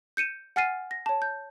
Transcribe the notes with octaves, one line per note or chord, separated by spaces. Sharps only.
G6 C#7 D#7 E7
F#5 G#5 F6 A6 C7 D#7
A#6
C#5 A5
G6